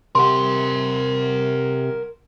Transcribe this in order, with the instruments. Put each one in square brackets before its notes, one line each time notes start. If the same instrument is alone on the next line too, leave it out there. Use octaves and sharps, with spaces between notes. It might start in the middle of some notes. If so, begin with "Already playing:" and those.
[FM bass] C3 [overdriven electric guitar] A#4 F#5 [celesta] C6